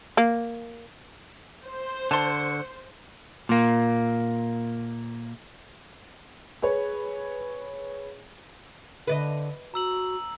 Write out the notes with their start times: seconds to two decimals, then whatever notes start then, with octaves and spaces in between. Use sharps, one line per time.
0.17 A#3
1.64 C5
2.11 D3 A5 C6 C#6
3.49 A#2 A#3
6.62 G#4 B4 C#5
9.07 D3 B4 D5 D#5
9.74 F#4 A#5 E6 F#7